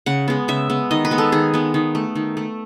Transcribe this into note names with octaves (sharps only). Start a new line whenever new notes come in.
C#3 F#5
G#3 B3
C#3 E5
G#3 B3
D#3 D#5
B4
G#3 B3
A4
D#3 G#4
G#3 B3
D#3
A3
D#3
A3